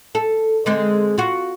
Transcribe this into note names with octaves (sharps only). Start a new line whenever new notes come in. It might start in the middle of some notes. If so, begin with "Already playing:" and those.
A4
D3 G#3 C4
F4 F#4